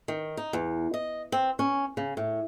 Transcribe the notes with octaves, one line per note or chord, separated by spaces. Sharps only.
D#3
D#4
E2
D#5
C4
C#4
C#3
A2